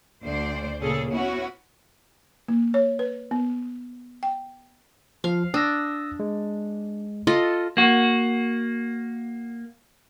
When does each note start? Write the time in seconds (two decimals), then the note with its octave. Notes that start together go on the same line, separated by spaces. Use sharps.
0.24 D2 C5 D5
0.80 A#2 C#3 C#4 G#4 A4
1.12 B3 C#4 E4 F#4 C#5
2.48 A#3
2.74 C#5
2.99 B4
3.31 B3
4.23 G5
5.24 F3 F5
5.54 D4 D#6 E6 A#6
6.20 G#3
7.27 F4 A4 D#5
7.77 A#3 F#4